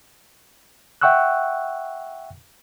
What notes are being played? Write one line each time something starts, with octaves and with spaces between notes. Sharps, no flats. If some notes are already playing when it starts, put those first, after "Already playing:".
E5 F#5 G5 C#6 E6 F#6